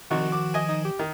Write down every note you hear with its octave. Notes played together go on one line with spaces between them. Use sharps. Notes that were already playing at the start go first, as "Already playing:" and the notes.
C2 D#3 F3 D#4 F#4
D6
D#5 G#5
D#4
G4
D#3